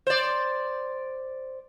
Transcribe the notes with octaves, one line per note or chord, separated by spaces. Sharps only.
C5 D5